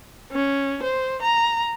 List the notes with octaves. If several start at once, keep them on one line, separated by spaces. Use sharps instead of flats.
C#4
C5
A#5